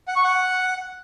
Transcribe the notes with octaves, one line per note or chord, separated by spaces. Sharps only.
F#5
C#6
F#5